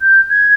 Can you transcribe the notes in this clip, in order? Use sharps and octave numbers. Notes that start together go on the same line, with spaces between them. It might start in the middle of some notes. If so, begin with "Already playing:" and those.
G6
G#6